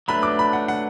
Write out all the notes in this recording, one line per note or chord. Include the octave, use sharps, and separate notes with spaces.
F#3 A3 D4 B4 B5
D6
B5
F#5
F#5